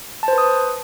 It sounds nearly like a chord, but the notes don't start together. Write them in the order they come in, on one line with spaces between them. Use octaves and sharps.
A5 C5 B4 D#6